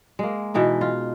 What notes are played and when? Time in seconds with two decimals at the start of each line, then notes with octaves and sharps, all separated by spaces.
0.19 G#3 A#3
0.54 B2 E3 D#4 E4
0.81 F4